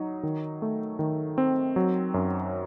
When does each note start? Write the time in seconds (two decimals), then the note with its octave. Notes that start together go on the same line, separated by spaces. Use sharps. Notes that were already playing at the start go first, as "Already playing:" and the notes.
Already playing: F#3 D#4
0.23 D#3
0.62 A3
0.99 D#3
1.38 C4
1.76 F#3
2.14 F#2